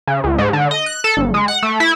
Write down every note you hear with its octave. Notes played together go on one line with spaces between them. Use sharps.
C#3
C#2
G#2
D3
D#5
F#6
A4
G1
G#3
F#5
A3
E4